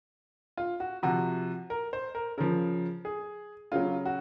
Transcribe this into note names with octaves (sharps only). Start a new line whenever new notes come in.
F4
F#4
C3 F3 F#4
A#4
C5
A#4
C#3 F3 A#4
G#4
C#3 F#3 F4
F#4